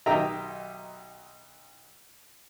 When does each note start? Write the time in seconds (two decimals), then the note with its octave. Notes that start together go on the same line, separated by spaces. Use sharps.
0.06 B1 D#3 D#4 G4 E5 A#5